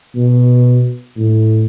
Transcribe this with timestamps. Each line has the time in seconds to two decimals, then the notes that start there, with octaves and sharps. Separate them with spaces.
0.16 B2
1.16 A2